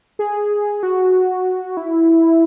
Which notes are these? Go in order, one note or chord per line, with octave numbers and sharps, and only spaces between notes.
G#4
F#4
E4